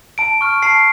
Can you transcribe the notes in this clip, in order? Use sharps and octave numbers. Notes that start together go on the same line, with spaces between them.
A5 D7
C#6 F6
A5 C7